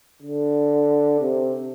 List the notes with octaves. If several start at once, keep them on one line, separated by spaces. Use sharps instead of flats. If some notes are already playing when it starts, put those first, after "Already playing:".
D3
C3